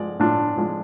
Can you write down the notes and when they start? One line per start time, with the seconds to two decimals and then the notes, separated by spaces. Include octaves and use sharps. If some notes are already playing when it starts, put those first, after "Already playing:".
Already playing: F3 G#3 D5
0.20 A2 D4 F4
0.58 F3 G#3